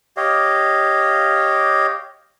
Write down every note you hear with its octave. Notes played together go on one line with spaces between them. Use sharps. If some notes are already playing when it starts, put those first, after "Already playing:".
G4 C#5 D#5 F5